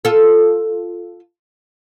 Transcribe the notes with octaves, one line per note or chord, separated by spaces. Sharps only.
F4 A4